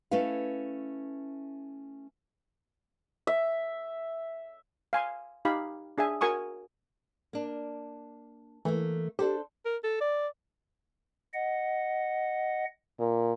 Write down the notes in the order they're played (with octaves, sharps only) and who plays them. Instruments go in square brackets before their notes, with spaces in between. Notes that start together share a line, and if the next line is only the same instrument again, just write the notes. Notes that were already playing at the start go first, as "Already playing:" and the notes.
[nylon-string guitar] A3 C#4 E4 B4 F5
[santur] E5
[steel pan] F5 G#5 C6
D#4 G4 F5 B5
D4 G#4 E5 G#5
F#4 A#4 G#5 C#6 D#6
[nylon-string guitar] A#3 D4
[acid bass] E3 [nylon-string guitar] A3 A#3
[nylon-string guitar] D4 A4 C5 [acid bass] G4
[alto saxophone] A#4
A4
D5
[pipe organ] D#5 F#5
[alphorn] A#2